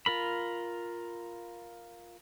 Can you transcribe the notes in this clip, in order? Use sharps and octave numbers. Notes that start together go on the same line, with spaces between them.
F4 A#4 B5